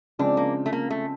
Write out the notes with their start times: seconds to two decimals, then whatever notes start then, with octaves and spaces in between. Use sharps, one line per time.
0.19 C#3 F3 G#3 C4 D4
0.37 A#3
0.66 A3
0.73 A#3
0.91 A3